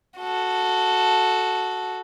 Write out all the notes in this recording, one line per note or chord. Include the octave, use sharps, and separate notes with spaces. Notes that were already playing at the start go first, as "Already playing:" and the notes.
F#4 A4